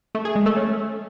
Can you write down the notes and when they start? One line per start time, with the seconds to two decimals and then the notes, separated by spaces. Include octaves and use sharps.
0.15 A3
0.25 G#4
0.35 G#3
0.46 A3
0.56 C#4